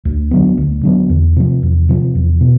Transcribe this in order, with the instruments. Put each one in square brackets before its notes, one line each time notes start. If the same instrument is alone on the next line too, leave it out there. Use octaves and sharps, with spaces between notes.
[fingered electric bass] D2
D3 F#3 B3
D2
D3 F#3 B3
E2
C3 F3
E2
C3 F3
E2
B2